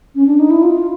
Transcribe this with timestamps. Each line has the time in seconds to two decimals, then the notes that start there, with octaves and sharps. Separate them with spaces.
0.15 C#4
0.27 D4
0.39 D#4
0.50 E4
0.63 F4